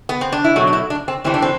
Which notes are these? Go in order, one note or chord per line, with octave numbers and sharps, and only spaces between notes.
B3
C4
D4
E4
B2 F#3 A3 F#4
D4
E4
D4
C4
A2 E3 G3 C4
D4
C4